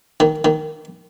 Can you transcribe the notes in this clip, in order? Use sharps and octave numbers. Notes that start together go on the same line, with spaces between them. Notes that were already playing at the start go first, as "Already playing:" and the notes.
D#3
D#3